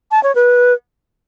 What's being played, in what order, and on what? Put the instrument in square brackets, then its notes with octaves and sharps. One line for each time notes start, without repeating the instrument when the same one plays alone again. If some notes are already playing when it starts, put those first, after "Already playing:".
[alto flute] A5
C#5
B4